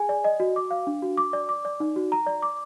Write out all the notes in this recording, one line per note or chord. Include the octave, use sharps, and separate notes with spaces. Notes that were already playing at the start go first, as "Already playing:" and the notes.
Already playing: G#4 G#5
D5
D#5
F#4
D6
F5
D4
F#4
D6
D5
D6
D5
D#4
F#4
A#5
D5
D6